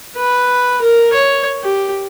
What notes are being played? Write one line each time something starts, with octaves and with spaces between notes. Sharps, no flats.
B4
A#4
C#5
G4